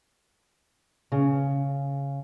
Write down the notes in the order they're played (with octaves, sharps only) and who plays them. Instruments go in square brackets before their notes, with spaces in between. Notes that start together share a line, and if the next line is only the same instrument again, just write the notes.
[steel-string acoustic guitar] C#3